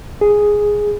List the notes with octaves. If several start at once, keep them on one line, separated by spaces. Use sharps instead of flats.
G#4